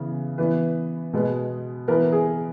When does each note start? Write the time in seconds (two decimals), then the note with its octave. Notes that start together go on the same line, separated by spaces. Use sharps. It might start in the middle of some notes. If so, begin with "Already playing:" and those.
Already playing: C#3 E3 B3
0.38 E3 B3 B4
1.13 B2 G#3 B3
1.88 E3 B3 A#4
2.12 G#4